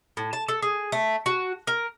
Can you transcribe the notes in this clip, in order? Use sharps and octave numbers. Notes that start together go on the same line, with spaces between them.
A2
A5
A4
G#4
A3
F#4
A#4